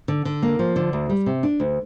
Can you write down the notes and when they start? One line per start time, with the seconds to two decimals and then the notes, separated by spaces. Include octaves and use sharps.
0.08 D3
0.25 D3
0.42 A#3
0.59 F3
0.76 D3
0.93 D2
1.10 G3
1.26 C3
1.43 D4
1.60 D2